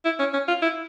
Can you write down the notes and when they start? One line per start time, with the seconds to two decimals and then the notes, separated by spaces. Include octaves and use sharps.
0.05 E4
0.19 C#4
0.33 C#4
0.48 F4
0.62 E4